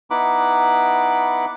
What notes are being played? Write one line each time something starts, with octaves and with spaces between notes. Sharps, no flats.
B3 D#4 E4 F#5 B5 D6